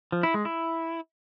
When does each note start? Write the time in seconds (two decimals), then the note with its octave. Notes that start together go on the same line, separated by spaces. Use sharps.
0.12 F3
0.23 E4
0.34 G#3
0.45 E4